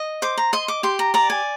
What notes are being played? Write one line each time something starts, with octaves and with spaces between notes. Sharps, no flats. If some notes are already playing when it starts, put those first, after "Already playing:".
Already playing: D#5
C5 D6
A#5
D#5 C6
D6
G4 C6
A#5
D5 A#5
G#5